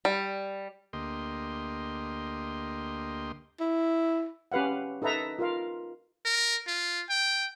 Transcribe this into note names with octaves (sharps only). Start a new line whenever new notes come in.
G3
D2 A#3 G4 D#5 C6
E4
C#4 G4 B4 F5 F#5
D#4 A4 B4 E5 A#5
F4 A#4 F5
A#4
F4
G5